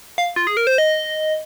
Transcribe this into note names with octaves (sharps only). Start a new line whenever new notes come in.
F5
F4
G#4
A#4
C5
D#5